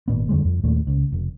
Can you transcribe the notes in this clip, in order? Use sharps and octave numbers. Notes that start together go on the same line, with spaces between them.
G#1 A#2 B3
F2 D3 G3 G#3
F2
D#2 A#2 A3
C#2
F1